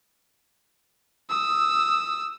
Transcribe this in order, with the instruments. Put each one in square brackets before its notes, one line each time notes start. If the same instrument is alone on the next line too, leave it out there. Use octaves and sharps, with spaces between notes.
[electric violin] D#6 E6